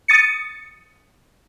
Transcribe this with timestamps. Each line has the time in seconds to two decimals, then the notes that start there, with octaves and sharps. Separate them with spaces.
0.08 D#6 A6 C#7